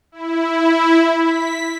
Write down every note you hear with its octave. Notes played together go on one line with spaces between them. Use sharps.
E4
B6